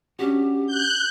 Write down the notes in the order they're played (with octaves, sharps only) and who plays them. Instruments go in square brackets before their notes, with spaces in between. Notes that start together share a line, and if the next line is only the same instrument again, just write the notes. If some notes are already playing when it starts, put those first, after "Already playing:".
[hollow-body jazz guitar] C#4 D4 F#4 [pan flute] G4
[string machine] F#6 G6